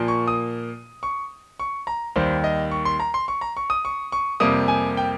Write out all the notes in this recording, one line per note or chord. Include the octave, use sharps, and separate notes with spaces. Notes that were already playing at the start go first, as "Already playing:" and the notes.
Already playing: A#2 F3 A#3
C#6
D#6
C#6
C#6
A#5
D#2 D#3 G3 C5
D#5
C#6
C6
A#5
C6
C#6
A#5
C#6
D#6
C#6
C#6
F2 C3 G3 A#3 D#6
G#5
G5